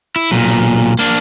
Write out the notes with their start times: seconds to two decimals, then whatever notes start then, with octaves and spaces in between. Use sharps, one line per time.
0.16 E4
0.31 B1 A#2
0.99 A#3 D4